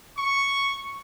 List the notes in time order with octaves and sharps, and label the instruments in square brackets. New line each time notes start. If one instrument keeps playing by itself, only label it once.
[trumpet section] C#6